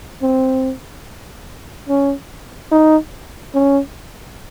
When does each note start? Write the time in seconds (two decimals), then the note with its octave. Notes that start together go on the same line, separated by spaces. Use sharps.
0.23 C4
1.89 C#4
2.72 D#4
3.54 C#4